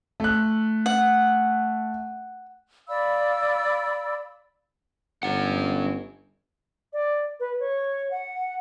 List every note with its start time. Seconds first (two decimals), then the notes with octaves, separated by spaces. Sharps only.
0.20 A3 F#6
0.86 F#5
2.88 D5 F5 B5 E6
5.23 G1 C#4 F#5
6.93 D5
7.40 B4
7.60 C#5
8.11 F#5